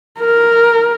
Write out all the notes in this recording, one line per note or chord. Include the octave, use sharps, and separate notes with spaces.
A#4